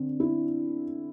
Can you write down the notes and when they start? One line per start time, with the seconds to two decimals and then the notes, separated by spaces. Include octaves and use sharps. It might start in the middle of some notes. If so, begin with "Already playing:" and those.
Already playing: D3 C4
0.20 E4